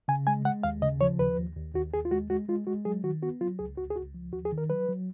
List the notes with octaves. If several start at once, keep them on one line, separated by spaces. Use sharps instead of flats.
C#3 G#5
G#3 G#5
G#3 F#5
D#2 F5
C#3 D#5
F3 C#5
D#2 B4
D#2
D#2
D#2 F#4
D#2 G#4
F4
G#3 F#4
G#3 F#4
G#3 F4
G#3 F#4
F#3 G#4
D#3 F#4
B3 F#4
F#3 F4
C#2 G#4
C#2 F#4
G#4
C#2 F#4
F3
D#2 F#4
G#4
D#3
A#4
F#3 B4
F#3